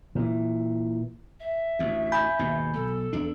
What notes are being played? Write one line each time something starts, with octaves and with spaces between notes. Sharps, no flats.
A#2 E3
E5
A1 D2
G#5 B5 G6
D#2 G#2 B2
B1 A4
E2 D4